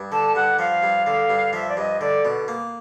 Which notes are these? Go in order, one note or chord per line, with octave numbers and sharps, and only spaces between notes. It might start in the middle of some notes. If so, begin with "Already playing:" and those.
Already playing: G2
D3 A5
G2 F#5
F3 F5
G2
D3
G2
F3 E5
D5
G2 D#5
D3 D5
B2
A#3